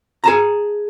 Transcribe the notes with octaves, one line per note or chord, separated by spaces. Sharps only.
G#4 A5 A#5